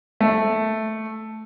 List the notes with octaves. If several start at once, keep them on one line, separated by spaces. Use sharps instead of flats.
A3